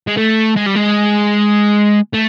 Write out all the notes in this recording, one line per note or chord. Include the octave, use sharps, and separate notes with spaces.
G#3
A3
G#3
G3
G#3
A3